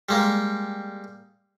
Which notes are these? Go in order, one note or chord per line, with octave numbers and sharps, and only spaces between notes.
G3 G#3 A#3